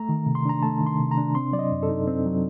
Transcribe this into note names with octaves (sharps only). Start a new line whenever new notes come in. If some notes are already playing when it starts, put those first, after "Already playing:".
Already playing: A3 A#5
D#3
C3
C6
D4 A#5
A3 A5
D#3
C6
C3
A#5
D4
C4 C6
F#3 D5
D#5
F#2
A4
D#4
C4
F#3